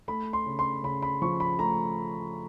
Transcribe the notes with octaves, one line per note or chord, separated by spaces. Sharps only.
A3 B5
C6
C#3
C6
C#3 B5
B5
F3 C#6
B5
A3 A#5